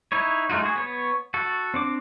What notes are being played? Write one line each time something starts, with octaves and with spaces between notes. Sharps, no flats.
D#4 E4 C#5
G#3 A3 D#4 F4 F#4
F#4 G#4
B3 C#5
F#4 A4
C4 D4 D6